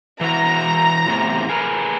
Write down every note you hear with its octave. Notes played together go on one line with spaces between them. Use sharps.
E3 E4 F#4 A#5
E2 A2 C3
G#4 A#4 B4